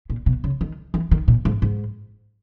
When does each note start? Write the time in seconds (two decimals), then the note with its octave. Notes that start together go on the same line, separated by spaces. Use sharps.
0.10 A#2
0.26 B2
0.44 C#3
0.61 D#3
0.94 E3
1.11 D#3
1.28 A#2
1.45 G#2
1.62 G#2